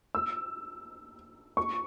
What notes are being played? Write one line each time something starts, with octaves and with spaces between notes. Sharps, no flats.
E6
C#6